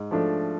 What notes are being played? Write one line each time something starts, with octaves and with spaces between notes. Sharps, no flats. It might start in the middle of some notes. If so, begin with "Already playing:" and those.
Already playing: G#2
F3 A3 D4